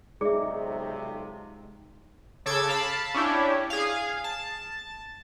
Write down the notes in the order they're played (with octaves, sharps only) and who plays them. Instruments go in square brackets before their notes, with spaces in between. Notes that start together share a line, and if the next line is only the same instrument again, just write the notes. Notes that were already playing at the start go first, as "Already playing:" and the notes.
[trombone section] B1 F2 C3 [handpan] G#3 D#4 [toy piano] G#4 [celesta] D5 E5
[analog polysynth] C#3 A4 A5 D6 E6 G#6
F5 A5 B5
C#4 D4 E4 G4
G#4 F5
A5